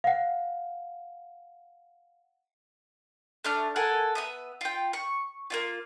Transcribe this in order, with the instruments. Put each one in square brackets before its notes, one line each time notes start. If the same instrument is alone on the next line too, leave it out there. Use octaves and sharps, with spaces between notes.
[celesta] F5 F#5
[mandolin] A3 D4 F6
A4 A#4 F#5 G#5
B3 E5 D#6
F4 G5
C#6
A#3 C#4 F4